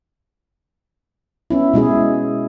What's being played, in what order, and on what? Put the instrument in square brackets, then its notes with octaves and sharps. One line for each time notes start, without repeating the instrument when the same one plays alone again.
[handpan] B3 C#4 E4
B2 G#3 E4 G#4